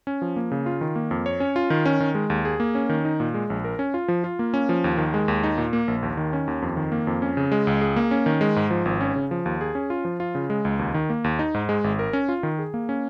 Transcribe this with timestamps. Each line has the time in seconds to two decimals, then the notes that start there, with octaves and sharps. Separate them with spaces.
0.07 C#4
0.22 F3
0.36 A#3
0.51 C#3
0.66 F4
0.81 D#3
0.96 A#3
1.11 F2
1.26 C#5
1.40 C#4
1.56 F4
1.70 D#3
1.85 C#4
2.00 D#3
2.15 G#3
2.30 D#2
2.45 G#4
2.60 A#3
2.75 C#4
2.89 D#3
3.05 D#4
3.20 A#2
3.34 G#3
3.50 A#1
3.64 A#4
3.79 C#4
3.94 F4
4.08 F3
4.24 F4
4.39 A#3
4.54 C#4
4.69 F3
4.84 D#2
4.98 D#3
5.14 G#3
5.28 D#2
5.43 D#4
5.58 A#2
5.73 A#3
5.88 A#1
6.03 D#2
6.17 D#3
6.33 C#4
6.48 D#2
6.62 F2
6.77 D#3
6.92 A#3
7.07 F2
7.22 C#4
7.37 C#3
7.52 G#3
7.67 C#2
7.82 G#4
7.96 A#3
8.11 C#4
8.26 D#3
8.41 G#3
8.56 G#2
8.71 F3
8.85 G#1
9.01 C#4
9.16 C#3
9.31 F3
9.46 D#2
9.61 G#4
9.75 C#4
9.90 F4
10.05 F3
10.20 F4
10.35 C#3
10.50 G#3
10.65 C#2
10.79 D#2
10.94 D#3
11.10 A#3
11.24 D#2
11.39 D#4
11.54 G#2
11.69 G#3
11.84 G#1
11.99 A#4
12.13 C#4
12.29 F4
12.43 D#3
12.59 G#4
12.74 A#3
12.89 C#4